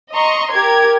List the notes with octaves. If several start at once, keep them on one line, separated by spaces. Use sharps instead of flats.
D#5 A#5 C6 C#6
G4 A#4 G#6